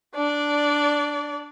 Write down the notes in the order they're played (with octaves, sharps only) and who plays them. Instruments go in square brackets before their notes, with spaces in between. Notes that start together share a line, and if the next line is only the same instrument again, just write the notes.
[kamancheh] D4 D5